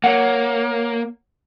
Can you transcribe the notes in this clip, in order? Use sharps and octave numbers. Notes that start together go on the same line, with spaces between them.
A#3 C#5 F#5